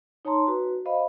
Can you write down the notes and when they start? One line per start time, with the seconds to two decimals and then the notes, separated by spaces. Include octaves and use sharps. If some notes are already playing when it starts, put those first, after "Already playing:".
0.25 D#4 C#5 A5 A#5 C6
0.47 F#4 B4
0.85 C5 D#5 F5 B5